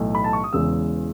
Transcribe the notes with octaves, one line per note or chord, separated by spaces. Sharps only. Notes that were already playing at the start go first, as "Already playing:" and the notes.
Already playing: B1 A2 E3 A3
B5
A5
C#6
D#6
E1 E2 C#3 G#3 E6